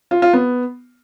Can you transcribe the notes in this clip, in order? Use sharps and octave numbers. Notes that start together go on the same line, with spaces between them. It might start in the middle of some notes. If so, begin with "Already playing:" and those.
F4
F4
B3